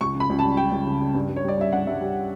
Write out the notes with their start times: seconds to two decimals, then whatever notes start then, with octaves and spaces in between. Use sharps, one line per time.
0.01 C#2 C#6
0.15 C#3
0.20 B5
0.30 C#2
0.39 A5
0.43 G3
0.57 G3 G5
0.72 C#2
0.87 C#3
1.01 C#3
1.15 G2
1.29 G2
1.36 C#5
1.44 G3 D5
1.58 G3 E5
1.73 G2 F#5
1.87 G2 E5
2.01 G3 G4